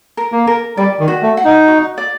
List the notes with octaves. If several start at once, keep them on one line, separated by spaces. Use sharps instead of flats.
A#4
A#3
A#4
G3 D5
D#3
F#4
A3
F#5
D#4
F#4
D5